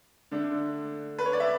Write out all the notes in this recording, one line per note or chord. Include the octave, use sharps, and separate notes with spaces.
D3 A3 D4
B4
C#5
D5
E5